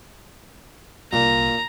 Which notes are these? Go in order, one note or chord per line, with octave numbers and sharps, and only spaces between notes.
C2 A#2 A#5